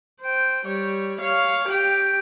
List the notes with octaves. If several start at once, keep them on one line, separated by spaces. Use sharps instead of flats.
C5 G5
G3 C#5
C#5 F5
G4 G5